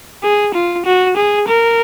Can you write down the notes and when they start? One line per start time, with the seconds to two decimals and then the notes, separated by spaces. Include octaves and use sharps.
0.23 G#4
0.54 F4
0.85 F#4
1.17 G#4
1.48 A#4